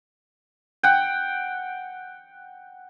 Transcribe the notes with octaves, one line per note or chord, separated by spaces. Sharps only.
F#5 G5